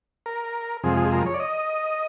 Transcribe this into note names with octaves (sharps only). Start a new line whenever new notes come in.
A#4
F2 C3 F3 G#3 G#4
G#4
A#4
C#5
D5
D#5